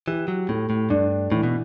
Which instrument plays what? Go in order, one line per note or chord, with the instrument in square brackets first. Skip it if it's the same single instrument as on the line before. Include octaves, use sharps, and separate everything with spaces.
[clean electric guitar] E3 [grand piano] G4
[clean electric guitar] F#3
[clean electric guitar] A2 [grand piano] A3
[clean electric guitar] A2
[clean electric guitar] G2 [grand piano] D4
[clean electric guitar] A2 [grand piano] E3
[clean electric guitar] B2